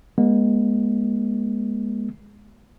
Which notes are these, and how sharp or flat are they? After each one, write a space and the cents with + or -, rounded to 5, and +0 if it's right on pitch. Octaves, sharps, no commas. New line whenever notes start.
G#3 +0 B3 -45